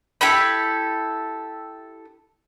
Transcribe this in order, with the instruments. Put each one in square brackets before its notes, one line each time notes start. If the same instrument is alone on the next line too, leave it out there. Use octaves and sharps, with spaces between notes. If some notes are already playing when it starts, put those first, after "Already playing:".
[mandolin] E4 G4 A4 B5